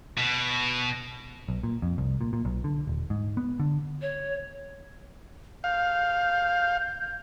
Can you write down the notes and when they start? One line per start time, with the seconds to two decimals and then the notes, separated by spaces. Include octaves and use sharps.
0.18 B2
1.48 B1
1.63 A#2
1.82 F2
1.98 C2
2.21 A#2
2.33 A#2
2.45 B1
2.64 D3
2.87 D#1
3.10 G#2
3.37 B3
3.60 D3
4.02 C#5
5.64 F5 G6